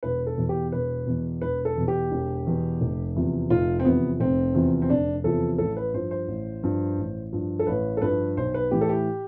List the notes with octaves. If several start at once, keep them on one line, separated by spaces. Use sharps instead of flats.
E1 B4
A4
E2 B2
G4
E1 B4
E2 B2
E1 B4
A4
E2 B2
G4
E1
E2 B2
F1
E2 C3 F3
F1 F4
C4
E2 C3 F3 B3
F1 C4
E2 C3 F3
C4
F1 D4
E2 C3 F3 A4
A1 A4
B4
G2 F3 C5
C5
A1
G2 F3
A1
G2 F3
A4
A1 B4
A4
G2 F3 B4
B1 C5
B4
A2 E3 G4
A4
G4